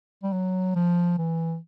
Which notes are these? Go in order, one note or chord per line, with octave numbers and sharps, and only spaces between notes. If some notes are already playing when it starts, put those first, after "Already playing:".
G3
F#3
F3
E3